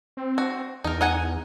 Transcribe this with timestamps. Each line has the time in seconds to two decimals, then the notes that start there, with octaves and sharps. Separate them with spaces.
0.17 C4
0.38 F#4
0.84 E2 D#4 A#4
1.01 D#4 F#5 G#5